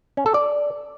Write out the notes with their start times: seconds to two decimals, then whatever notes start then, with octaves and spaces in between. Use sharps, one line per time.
0.17 C#4
0.26 A4
0.34 D5